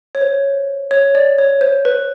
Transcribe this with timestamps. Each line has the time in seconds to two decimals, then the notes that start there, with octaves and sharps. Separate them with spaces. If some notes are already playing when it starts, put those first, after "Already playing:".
0.15 C#5
0.21 C5
0.91 C#5
1.15 D5
1.38 C#5
1.61 C5
1.85 B4